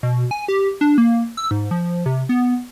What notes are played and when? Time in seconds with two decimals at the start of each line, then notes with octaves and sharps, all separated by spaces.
0.03 B2
0.31 G#5
0.48 G4
0.81 D4
0.98 A#3
1.37 E6
1.51 G#2
1.71 F3
2.06 C3
2.29 B3